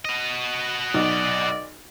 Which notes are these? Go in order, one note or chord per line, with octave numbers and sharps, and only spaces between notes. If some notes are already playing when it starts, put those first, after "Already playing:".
F#4 D#5
B1 D5